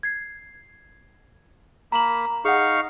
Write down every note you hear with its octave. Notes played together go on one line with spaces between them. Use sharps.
G#6 C7
A#3 A#5 B5 E7 F#7
D#4 G#4 F5 F#5 C#6